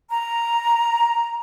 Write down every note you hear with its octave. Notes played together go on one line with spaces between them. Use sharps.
A#5